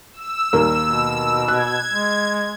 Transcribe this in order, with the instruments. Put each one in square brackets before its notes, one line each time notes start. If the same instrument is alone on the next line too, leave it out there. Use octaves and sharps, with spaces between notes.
[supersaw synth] E6
[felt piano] D#2 A#3 [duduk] G3
[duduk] B2
[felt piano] F#6 [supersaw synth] G#6
[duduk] G#3